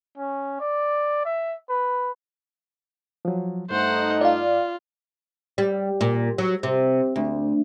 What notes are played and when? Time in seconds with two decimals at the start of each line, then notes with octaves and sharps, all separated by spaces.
0.18 C#4
0.60 D5
1.25 E5
1.69 B4
3.25 F3 F#3
3.70 G2 A3 D#4 C5 F#5
4.21 F4 D5 F5
5.58 G3
6.01 A#2
6.38 F#3
6.63 C3
7.16 D2